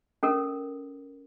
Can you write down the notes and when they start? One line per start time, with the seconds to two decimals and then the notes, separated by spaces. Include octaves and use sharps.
0.23 C#4 A4 A#4